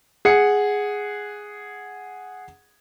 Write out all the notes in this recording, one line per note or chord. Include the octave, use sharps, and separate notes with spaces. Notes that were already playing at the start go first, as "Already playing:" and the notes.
G#4 F#5 C#7